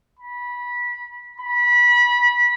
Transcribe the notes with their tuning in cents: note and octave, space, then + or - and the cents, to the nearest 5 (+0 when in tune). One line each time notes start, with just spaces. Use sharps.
B5 -20
B5 -25